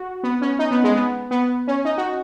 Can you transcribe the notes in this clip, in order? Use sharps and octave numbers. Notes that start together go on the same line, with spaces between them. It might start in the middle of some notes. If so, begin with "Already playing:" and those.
Already playing: F#4
B3
C#4
D#4
B3
G#3
B3
B3
C#4
D#4
F#4